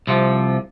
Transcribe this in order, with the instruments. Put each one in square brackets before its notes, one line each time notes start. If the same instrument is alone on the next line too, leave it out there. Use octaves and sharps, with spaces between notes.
[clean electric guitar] C2 C3 F3